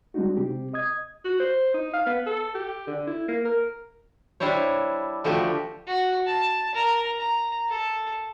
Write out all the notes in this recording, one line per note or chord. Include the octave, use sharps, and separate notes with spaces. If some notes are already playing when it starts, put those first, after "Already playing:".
G3 G#3 C4 D4 D#4 F#4
C3 C4 G4
D#5 D#6 G#6
F#4
C5
D#4
F5
B3
A4
G4
D3
E4
A#3
A#4
G3 D4 E4 C5 C#5
D3 F3 A3 F#4 G4
F#4
A5
A#4
A#5
A4